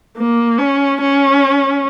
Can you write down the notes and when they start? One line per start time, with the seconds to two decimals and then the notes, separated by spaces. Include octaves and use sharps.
0.17 A#3
0.59 C#4
1.01 C#4